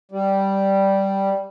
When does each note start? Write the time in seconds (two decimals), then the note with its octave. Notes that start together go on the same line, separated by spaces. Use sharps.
0.12 G3